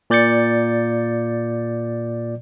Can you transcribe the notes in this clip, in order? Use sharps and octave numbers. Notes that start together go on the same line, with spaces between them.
A#2 D5 G6 A6 C#7